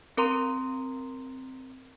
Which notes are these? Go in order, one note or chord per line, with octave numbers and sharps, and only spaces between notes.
C4 A#4 A#5 C6